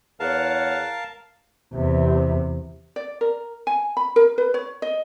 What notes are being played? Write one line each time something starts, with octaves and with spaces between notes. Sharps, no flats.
E2 A#4 C#5 F5 F#5 A5
E2 C3
D5
A#4
G#5
B5
A#4
B4
C#5
D#5